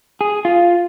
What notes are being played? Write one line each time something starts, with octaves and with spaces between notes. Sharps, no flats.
G#4
F4